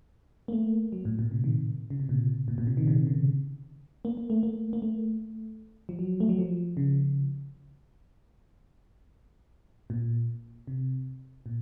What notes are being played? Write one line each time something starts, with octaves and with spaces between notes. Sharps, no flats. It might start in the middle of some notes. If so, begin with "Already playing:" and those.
A#3
A3
F#3
A2
A#2
C3
D#3
C#3
C3
A#2
A#2
A#2
C3
D#3
C3
C#3
A#3
A#3
A3
A#3
A#3
A3
F3
F#3
A3
F#3
F3
C#3
A#2
C3
A#2